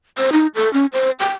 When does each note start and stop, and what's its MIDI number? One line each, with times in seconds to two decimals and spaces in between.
0.18 0.30 72
0.32 0.47 63
0.55 0.72 69
0.73 0.86 61
0.93 1.11 72
1.20 1.34 79